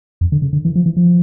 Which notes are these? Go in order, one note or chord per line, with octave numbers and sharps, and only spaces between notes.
F2
D3
C#3
D3
E3
F3
E3
F3